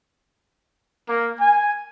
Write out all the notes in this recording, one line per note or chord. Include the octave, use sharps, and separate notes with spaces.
A#3
G#5